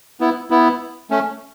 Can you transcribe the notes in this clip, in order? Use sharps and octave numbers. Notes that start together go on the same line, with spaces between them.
B3 E4
B3 E4
A3 C#4